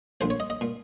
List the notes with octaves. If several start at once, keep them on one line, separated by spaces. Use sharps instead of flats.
A#1 A#2 C5
C#5
D#5
D#5
A#2